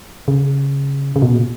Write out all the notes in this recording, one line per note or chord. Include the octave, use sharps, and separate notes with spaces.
C#3
C#3
B2
A#2